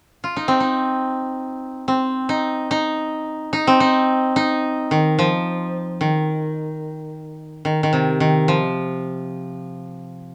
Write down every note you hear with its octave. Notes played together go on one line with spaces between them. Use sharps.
F4
D#4
C4
D#4
C4
D#4
D#4
D#4
C4
D#4
D#4
D#3
F3
D#3
D#3
D#3
C3
D#3
F3